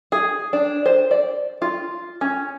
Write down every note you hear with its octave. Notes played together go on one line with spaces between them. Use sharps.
G#4
D4
C5
D5
F4
C#4